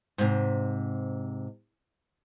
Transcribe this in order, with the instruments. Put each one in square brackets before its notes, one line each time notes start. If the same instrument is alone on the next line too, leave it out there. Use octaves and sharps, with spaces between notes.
[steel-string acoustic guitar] G#2 C3